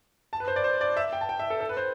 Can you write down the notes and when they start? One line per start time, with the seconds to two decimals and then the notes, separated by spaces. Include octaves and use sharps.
0.33 A5
0.40 B4
0.48 C5
0.56 D5
0.64 C5
0.81 D5
0.97 E5
1.13 G5
1.21 A5
1.29 G5
1.39 E5
1.50 A4
1.60 A4
1.69 B4
1.77 C5